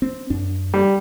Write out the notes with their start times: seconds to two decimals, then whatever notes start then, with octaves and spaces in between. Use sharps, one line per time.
0.02 C4
0.30 F#2 D4
0.74 G3